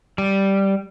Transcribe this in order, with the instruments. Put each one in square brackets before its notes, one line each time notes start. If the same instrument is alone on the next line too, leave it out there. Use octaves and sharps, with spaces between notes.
[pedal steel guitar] G3